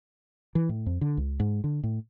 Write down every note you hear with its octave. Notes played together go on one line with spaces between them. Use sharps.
E3
A2
F2
D3
C#2
G#2
D3
A2